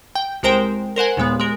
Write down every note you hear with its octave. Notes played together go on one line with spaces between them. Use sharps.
G5
C2 G#3 A#4 C5 G5
A#4 C5 F#5 G#5
D#2 A#2 G#3 B3
G#3 A#4